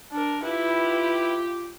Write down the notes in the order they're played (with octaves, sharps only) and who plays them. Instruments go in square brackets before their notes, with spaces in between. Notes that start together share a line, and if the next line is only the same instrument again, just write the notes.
[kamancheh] D4 A#4
[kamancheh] E4 B4 [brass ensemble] F4 G4